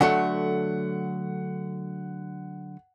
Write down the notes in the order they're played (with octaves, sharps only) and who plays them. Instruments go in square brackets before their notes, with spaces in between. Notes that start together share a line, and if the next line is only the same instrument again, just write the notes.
[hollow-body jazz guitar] D3 F#3 A3 [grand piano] F#5